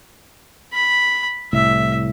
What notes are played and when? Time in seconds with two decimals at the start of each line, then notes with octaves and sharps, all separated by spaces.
0.73 B5
1.53 C2 A2 E5